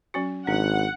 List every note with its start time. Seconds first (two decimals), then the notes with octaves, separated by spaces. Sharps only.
0.14 F#3 C#4 F#4
0.47 G#1 D4 F#5